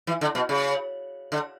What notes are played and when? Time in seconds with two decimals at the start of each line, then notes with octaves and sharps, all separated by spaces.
0.07 E3
0.21 D3
0.35 B2
0.49 C#3
1.32 D3